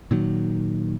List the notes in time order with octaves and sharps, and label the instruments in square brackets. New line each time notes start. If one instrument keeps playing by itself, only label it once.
[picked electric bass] A#2 D#3 F#3